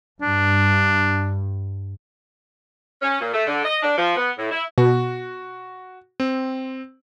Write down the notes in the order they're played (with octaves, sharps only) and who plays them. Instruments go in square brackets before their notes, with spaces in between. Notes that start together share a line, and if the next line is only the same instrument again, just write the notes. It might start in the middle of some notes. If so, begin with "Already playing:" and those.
[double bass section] G2 [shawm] D4
[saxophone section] C#4
A#2
A3
D3
D#5
D4
F3
B3
A2
E4
[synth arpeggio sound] B2 [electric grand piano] F#4
[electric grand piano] C4